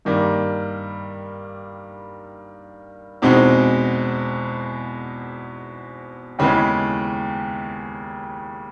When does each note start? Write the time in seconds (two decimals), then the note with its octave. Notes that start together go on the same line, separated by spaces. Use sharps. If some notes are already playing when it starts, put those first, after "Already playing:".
0.05 G2 D#3 G3 A#3
3.22 E2 B2 G#3 C4 D#4
6.39 D#2 C#3 E3 G#3 B3